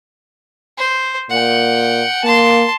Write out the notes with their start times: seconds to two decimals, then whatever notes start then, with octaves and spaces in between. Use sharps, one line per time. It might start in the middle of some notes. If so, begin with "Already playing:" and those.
0.78 C5
1.30 A#2 F#5 G5
2.24 A#3 A5 C6